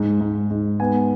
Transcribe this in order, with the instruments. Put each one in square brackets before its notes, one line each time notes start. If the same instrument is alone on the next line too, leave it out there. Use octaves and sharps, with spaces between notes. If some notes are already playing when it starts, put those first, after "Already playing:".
Already playing: [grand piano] G#2
G#2
G#2
B3 G#5